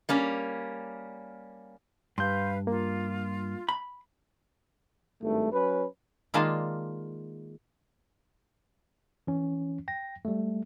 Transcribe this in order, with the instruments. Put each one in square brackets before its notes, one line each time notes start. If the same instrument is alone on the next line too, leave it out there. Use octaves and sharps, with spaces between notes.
[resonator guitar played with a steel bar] G3 A#3 C#4
[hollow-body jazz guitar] G2 [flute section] B4 F5 [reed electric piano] C6 G6
[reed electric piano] A#3 [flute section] F4
[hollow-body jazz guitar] B5
[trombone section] G#1 G2 A3
F#3 C#4 B4
[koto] D#3 G#3 A#3 F4 D5 A5
[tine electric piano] E3 C#4
G5 A#6
G3 A3